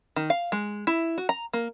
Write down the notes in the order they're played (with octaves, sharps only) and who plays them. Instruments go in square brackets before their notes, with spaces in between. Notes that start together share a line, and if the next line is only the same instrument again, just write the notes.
[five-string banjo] D#3
F5
G#3
E4
F#4
A#5
A#3